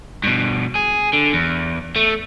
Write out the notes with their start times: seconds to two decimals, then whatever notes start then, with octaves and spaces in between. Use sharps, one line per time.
0.24 G2 B2
0.75 G#4
1.13 D3
1.33 E2
1.96 A3